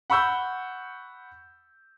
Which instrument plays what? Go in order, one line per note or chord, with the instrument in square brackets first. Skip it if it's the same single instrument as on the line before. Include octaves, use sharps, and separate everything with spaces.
[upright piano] F#5 B5 C#6 E6 G6